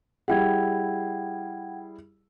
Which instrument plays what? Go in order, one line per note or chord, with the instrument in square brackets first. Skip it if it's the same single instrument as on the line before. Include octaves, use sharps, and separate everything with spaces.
[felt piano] G3 E4 G#4 [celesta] F#5 G5 G#6